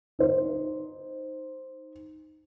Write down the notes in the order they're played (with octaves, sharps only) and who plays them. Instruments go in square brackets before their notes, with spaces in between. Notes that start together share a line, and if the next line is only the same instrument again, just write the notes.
[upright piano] D#4 C5